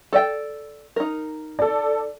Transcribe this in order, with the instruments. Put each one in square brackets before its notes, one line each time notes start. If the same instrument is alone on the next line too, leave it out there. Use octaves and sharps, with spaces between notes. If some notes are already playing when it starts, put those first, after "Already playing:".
[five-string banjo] A4 D5 G5
D#4 A#4
[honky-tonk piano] A4 D5